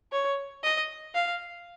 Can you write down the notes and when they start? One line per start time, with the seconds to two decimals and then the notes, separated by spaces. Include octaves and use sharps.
0.12 C#5
0.63 D#5
1.14 F5